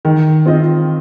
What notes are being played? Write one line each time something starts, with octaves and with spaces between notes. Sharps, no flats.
D#3
C4 F4 D#5